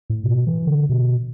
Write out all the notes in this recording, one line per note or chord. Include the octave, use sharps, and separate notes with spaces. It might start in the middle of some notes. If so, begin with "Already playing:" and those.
A2
B2
E3
D3
B2